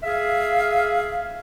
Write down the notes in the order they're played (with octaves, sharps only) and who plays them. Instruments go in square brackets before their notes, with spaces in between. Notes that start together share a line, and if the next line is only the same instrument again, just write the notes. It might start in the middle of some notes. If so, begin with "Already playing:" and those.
[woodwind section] G#4 E5 F5